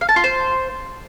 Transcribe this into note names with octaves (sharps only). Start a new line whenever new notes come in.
F5
A5
F4
C5